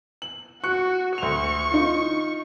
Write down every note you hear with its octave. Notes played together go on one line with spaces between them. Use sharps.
F#7
F#4 C#6 F#6 C#7
D2 C#6 F7
D#4 F4